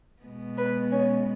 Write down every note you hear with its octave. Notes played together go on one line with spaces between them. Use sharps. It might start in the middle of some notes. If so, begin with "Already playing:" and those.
B2 G#3 B3
B4
C#4